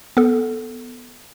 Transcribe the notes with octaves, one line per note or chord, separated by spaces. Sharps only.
B3 A4